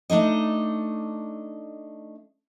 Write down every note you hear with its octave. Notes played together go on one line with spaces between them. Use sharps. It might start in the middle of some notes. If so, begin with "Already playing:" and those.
A3 D4 D#4 D#5